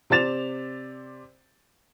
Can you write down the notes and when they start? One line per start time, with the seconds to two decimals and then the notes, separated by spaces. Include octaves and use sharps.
0.10 C3 C5 D5 A6 E7 F7